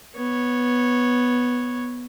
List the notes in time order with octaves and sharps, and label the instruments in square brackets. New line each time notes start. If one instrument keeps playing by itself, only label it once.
[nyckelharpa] B3 C#5